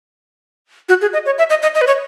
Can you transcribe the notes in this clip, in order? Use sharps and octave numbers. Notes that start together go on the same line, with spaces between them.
F#4
G#4
D#5
C#5
E5
D#5
D#5
D#5
B4
C#5